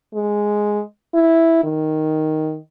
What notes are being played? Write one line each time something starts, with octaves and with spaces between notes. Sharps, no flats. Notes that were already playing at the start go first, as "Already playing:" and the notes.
G#3
E4
D#3